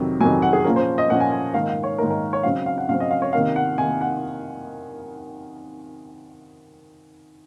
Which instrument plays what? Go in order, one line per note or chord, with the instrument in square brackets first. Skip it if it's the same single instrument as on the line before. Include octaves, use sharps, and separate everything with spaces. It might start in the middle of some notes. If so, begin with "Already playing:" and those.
Already playing: [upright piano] F2 C3 D#3 F#3
F2 C3 D#3 F#3 G#5
F#5
G#4
A#2 F3 A#3 C#4 A#4
C5
D#5
A#2 F3 A#3 C#4 F#5
G#5
G#5
G#2 D#3 A#3 F5
F5
C#5
G#2 D#3 A#3 A#4
A#4
C#5
C#3 F#3 C4 F5
F5
F#5
C#3 F#3 C4 F5
D#5
F5
C#5
C3 D#3 A#3 F5
F#5
C3 D#3 A#3 G#5
F#5